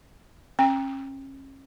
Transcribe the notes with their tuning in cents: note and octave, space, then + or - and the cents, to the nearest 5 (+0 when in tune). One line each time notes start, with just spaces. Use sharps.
C#4 -35 G5 +15